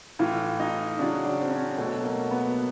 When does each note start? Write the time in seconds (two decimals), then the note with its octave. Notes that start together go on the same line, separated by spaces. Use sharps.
0.19 A2 E3 F4
0.60 D#4
0.99 C#3 F#3 D4
1.25 D4
1.41 C4
1.51 C#4
1.78 B2 F#3 A3
2.04 A#3
2.31 B3